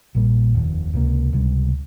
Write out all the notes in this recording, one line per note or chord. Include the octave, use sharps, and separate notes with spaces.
A#1 A#2 G3 A#3
F1 D#2 D#3
C#2 C3 F3 A#3
C#2 C3 G3